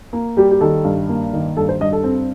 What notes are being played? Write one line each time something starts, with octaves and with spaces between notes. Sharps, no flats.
A#3
G3 G4
G4
D#3 A4
G2
A#3
D#3
G2 A4
C5
G2 D#5
A4
C4